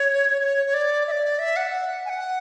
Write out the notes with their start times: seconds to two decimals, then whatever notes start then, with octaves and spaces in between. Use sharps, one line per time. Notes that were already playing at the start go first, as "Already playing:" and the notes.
Already playing: C#5
0.42 C#5
0.66 C#5
0.74 D5
1.07 E5
1.12 D5
1.39 E5
1.56 F#5
1.72 F#5
2.05 G#5
2.10 F#5